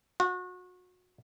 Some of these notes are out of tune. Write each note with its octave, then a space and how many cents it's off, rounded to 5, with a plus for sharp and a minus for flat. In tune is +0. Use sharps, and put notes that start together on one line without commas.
F#4 -30